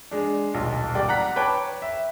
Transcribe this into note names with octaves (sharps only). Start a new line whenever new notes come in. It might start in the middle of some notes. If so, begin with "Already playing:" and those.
G#3 D4
D#1 B1 F4
G#1 G3 D5 G5
F#5 A#5 F#6 B6
B4 C#5 G5 A5 D6
E5